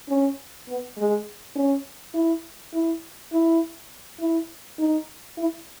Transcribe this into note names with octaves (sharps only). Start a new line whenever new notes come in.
C#4
B3
G#3
C#4
E4
E4
E4
E4
D#4
E4